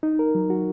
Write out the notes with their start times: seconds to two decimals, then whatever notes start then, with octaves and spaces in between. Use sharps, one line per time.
0.03 D#4
0.19 A#4
0.35 F#3
0.50 F#4